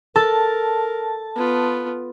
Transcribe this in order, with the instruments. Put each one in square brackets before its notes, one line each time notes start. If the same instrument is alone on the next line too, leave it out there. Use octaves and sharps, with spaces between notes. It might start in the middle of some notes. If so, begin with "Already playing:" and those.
[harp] A4 [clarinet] A#4 [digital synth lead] A5
[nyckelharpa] B3 F4